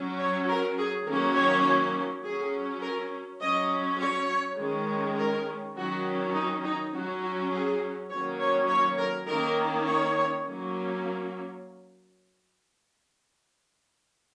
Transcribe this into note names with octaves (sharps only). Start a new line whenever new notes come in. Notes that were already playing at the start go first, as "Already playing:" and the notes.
Already playing: F#3 C#4
C#5
A#4
G#4
D#3 F#3 A#3 C#4 A#4
C#5
F#3 C#4 G#4
A#4
F#3 C#4 D#5
C#5
D#3 G#3 C#4
A#4
D#3 F#3 C#4 F#4
D#4
D#4
F#3 C#4 F#4
F#4
G#4
D#3 F#3 A#3 C#4 C#5
C#5
C#5
A#4
D#3 A#3 C#4 A#4
C#5
F#3 A#3 C#4